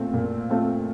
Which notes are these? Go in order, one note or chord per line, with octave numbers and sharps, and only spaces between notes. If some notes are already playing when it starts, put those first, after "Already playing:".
Already playing: A#2 A3 C4 F4
A#2
A3 C4 F4